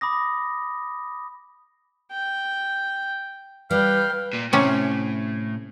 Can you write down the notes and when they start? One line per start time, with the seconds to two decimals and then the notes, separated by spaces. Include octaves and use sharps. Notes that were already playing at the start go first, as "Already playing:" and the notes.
0.01 B5 D6 D#6 A#6
2.11 G5
3.71 G3 B4 F5 G5
4.34 A#2
4.53 A2 C3 C#4